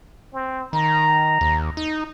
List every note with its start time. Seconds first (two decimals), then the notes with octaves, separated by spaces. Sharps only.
0.34 C4
0.73 D#3 A#5
1.41 D#2
1.77 D#4